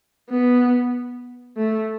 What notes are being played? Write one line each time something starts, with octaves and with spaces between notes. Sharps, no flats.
B3
A3